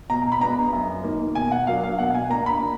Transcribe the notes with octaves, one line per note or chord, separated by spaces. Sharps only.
B2 A#5
B5
G#3 B3 D4 A#5
F#2
D#3 A#3
B2 G#5
F#5
F#3 A#3 D4 F5
F5
B2 F#5
G#5
A#3 D4 A#5
B5
D3